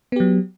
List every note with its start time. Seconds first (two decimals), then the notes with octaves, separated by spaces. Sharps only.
0.12 B3
0.16 G4
0.20 F#3